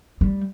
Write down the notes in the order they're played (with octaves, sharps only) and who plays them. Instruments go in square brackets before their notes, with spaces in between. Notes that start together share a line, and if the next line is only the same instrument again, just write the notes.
[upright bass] G3